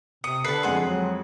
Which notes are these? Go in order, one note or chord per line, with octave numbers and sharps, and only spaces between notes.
C3 D#6 C#7
D3 B4 A5 C7
F2 G#3 G#4 F#5 C6
F#3